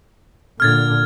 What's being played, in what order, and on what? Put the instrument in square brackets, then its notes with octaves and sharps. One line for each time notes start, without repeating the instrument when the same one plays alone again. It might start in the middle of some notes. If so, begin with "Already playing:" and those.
[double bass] A#2 D3 [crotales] F6 G#6 A6